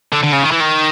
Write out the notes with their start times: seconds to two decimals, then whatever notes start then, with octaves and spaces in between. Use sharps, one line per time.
0.13 D3
0.23 D3
0.33 C#3
0.43 D#3
0.51 E3
0.60 D#3